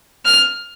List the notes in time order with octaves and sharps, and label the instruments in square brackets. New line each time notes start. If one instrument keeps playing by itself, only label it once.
[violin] F6